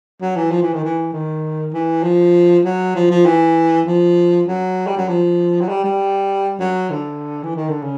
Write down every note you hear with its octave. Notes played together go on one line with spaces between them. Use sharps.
F#3
E3
F3
E3
D#3
E3
D#3
E3
F3
F#3
F3
F3
E3
F3
F#3
G3
F#3
F3
F#3
G3
G3
F#3
D3
E3
D#3
D3
C#3